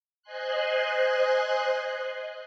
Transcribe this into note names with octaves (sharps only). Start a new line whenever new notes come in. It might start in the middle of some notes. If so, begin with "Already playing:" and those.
C5 D#5 G#5 C6 F#6